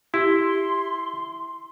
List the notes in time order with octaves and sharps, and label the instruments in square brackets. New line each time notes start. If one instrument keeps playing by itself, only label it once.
[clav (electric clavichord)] E4 [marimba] G4 [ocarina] C6